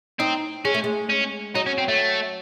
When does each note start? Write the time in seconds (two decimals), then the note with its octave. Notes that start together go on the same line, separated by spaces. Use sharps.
0.19 C4 D#4
0.65 G#3 C#4
0.74 A3
0.84 G#3
1.09 C#4
1.55 F#3 D#4
1.66 C#4
1.78 C4
1.89 A3